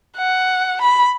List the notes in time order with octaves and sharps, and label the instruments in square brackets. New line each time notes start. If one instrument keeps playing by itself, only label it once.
[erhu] F#5
B5